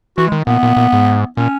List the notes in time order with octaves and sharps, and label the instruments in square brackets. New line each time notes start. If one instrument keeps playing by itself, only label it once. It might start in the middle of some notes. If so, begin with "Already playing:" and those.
[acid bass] E3 [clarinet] F#4
[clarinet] G#3
[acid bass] D#3
[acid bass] A#2 [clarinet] B3
[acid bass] A#2
A#2
G#2
[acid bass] A#2 [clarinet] C#4